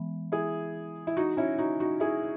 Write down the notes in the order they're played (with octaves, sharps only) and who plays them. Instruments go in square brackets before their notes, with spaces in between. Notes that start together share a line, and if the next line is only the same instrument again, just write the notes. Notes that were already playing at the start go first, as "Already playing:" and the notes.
Already playing: [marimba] E3 G#3 B3
[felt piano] E4 G#4
E4
D#4 F#4
C#4 E4
D#4 F#4
D#4 F#4
E4 G#4